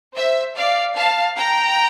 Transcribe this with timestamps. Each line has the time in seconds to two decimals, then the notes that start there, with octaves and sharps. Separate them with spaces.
0.15 C5 E5
0.55 D5 F5
0.95 F5 A5
1.36 G5 A#5